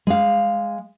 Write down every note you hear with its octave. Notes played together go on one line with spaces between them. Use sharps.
G#3 F5